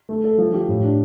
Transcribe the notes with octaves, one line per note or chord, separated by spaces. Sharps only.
A3
A4
F3
G4
A2
D4